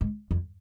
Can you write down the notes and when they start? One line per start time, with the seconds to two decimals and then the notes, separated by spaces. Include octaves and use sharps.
0.01 G#2
0.31 F2